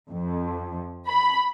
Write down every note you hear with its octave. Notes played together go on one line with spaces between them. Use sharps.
F2
B5